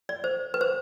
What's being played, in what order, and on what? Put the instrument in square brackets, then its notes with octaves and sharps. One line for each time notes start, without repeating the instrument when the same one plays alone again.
[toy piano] D5
C5
B4
C5